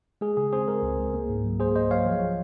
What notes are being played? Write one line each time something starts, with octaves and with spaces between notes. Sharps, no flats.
G#3 G#4
C#3 G#4
C4 G#4 C5
G#3 A#4
C#2
C#2
A#3
G#2
F#3
A#3 G#4 C5
A#3 C5 D#5
F#3 C#5 F5
F3
F3